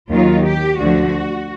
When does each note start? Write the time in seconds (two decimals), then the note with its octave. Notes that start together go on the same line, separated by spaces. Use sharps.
0.10 D#2 D#3 F#3 F4
0.44 G4
0.79 D2 D3 F3 F#4